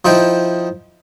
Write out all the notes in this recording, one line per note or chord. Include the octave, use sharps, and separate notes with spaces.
F3 D#4 E4 G5